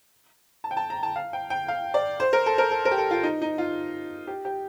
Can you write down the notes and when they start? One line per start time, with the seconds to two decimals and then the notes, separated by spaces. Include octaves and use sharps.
0.64 A5
0.71 G5
0.77 A5
0.90 A#5
1.03 A5
1.16 F5
1.33 G5
1.50 G5
1.68 F5
1.94 D5
2.20 C5
2.33 A#4
2.46 A4
2.58 A#4
2.71 A4
2.85 A#4
2.91 G4
2.98 A4
3.11 F4
3.23 D#4
3.42 D#4
3.58 F4
4.27 G4
4.45 G4